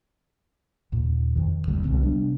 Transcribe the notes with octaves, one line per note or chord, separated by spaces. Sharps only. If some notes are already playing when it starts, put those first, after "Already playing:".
D#2 A#2
F2 D#3
E1 D2 D3 G3
C2 B2 G#3 C4
C3 G3 B3 D4